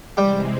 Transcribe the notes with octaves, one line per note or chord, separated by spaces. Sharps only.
C3 E3 G3 G#3 C4 G4